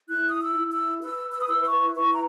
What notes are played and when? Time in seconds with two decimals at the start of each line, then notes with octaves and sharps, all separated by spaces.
0.09 E4 F#6
0.29 D#6
0.41 E6
0.56 E4
0.71 E6
1.02 B4 E6
1.33 E6
1.40 D#6
1.49 E4 E6
1.64 C#6
1.95 B4 C#6
2.12 A#5